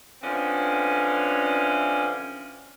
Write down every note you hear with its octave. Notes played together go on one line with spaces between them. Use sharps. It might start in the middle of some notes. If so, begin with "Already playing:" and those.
D3 E3 F3 C4 C#4